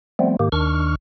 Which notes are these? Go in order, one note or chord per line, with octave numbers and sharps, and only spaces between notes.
F3 G3 A3 B3 C4
G#2 D#3 A#3 G4
D#2 D#3 D4 C#6 F6